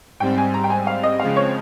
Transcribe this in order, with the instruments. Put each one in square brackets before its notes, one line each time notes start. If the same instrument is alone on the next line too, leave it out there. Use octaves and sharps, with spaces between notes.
[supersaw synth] G#2 G3 C4 [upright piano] G5
[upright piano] G#5
A#5
G5
G#5
F5
D#5
[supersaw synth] C#3 F3 G#3 C4 [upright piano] F5
[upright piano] C#5